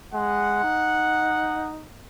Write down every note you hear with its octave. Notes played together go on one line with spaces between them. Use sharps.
G#3 F#5
D#4